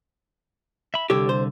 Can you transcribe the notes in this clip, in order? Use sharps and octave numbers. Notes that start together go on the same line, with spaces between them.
E5 B5
C2 D3 G4 A4 C#5
C5